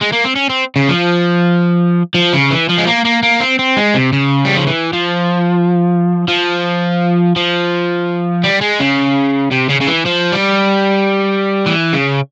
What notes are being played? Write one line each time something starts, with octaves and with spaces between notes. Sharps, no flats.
G#3
A#3
C4
C#4
C4
C#3
F3
F3
C#3
E3
F3
G#3
A#3
A#3
A#3
C4
C4
G#3
C3
C#3
G3
F3
E3
F3
F3
F3
G3
G#3
C#3
C3
C#3
C#3
E3
F3
G3
E3
C#3